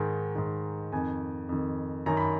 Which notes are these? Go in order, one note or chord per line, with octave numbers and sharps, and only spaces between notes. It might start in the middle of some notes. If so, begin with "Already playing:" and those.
Already playing: G#2 D#3
G#2 D#3
F2 D#3 G#5
F2 D#3
F#2 D#3 A#5
B5